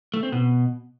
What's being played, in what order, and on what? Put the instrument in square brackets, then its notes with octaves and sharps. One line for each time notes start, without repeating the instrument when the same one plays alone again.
[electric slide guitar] A3
C4
B2